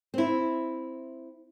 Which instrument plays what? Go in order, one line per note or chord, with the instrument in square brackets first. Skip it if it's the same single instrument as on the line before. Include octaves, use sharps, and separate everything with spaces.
[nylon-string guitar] C4 E4